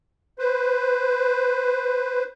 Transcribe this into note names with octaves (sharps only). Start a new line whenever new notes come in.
B4 C5